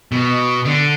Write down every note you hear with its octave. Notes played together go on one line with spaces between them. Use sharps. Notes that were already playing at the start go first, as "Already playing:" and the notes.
B2
D3